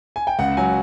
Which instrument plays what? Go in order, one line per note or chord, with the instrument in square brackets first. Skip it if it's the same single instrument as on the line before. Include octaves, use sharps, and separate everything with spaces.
[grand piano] G#5
G5
C#2 F#5
F#3 G#5